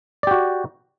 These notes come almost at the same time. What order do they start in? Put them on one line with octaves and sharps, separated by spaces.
D5 G4 F#4